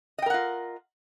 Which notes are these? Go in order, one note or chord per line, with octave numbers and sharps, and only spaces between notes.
F4 A#4 D#5 F#5 G5